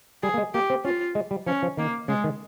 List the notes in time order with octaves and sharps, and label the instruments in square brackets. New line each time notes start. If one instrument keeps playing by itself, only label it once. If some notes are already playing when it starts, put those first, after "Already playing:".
[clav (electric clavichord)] G3 [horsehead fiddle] G#4
[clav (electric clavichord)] A#3
G#3
[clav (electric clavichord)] A#3 [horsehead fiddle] G4
[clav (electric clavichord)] C4
[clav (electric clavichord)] C#4 [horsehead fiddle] F4
[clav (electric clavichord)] G#3
G3
[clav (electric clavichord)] F3 [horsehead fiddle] C#4
[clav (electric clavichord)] F3
[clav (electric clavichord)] D#3 [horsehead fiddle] A#3
[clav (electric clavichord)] C#3 [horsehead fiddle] G#3
[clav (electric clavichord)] D#3